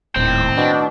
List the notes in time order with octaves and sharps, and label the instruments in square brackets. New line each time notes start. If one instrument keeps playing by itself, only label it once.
[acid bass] D#1 [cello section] A2 D#3 [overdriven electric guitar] C4
[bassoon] B2 [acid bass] D4